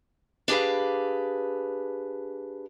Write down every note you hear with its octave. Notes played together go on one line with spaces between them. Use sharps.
D4 G4 G#4 B4 F5